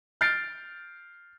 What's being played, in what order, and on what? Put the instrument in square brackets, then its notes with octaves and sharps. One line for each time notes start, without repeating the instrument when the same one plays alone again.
[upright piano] F6 G6 A6 C7 D7